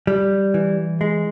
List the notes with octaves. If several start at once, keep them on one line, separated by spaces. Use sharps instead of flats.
G3
E3
G#3